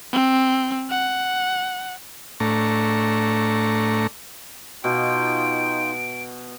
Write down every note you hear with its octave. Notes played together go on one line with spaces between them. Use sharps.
C4
F#5
A2 A3 D4 A#5 C#6
B2 D#4 F4 G5 D7